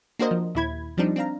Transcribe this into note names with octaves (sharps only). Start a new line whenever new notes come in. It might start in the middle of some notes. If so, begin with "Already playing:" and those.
A#3 D4 F#4 A#4 C5 D#5
F3
D#2 A#2 E4 B5 G#6
F3 G3 C4 D4 D#4
C4 D4 F5 A#5